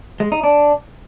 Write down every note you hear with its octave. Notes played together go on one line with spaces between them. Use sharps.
G#3
D#4
D4